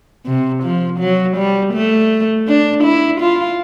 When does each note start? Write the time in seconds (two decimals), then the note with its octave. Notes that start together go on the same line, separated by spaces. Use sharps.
0.26 C3
0.63 F3
1.00 F#3
1.37 G3
1.73 A3
2.48 D4
2.84 E4
3.21 F4